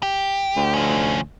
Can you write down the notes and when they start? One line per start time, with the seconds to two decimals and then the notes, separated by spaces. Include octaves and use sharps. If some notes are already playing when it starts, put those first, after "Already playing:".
0.03 G4
0.56 D2
0.74 F3 C#4